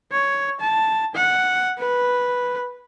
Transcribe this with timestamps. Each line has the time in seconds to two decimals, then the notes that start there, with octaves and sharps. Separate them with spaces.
0.11 C#5
0.60 A5
1.15 F#5
1.78 B4